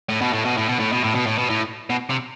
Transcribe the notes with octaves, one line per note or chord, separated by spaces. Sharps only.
A2
B2
A2
B2
A2
B2
A2
B2
A2
B2
A2
B2
A2
B2
C3